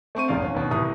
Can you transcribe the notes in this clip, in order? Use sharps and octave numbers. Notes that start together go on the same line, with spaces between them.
A3 C4 C#6 D#7
D1 A#1 E2 C#3 D5 F5
G#1 C#4
D#2 B2
C2 A2 E3 G3 C#6 D#6